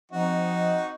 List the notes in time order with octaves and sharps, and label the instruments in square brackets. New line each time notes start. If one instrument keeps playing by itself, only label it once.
[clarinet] F3 [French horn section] C4 D#5 [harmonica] D#4 F#4